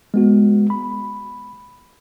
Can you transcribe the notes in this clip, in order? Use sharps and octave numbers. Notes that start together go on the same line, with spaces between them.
G#3 B3 F#4
B5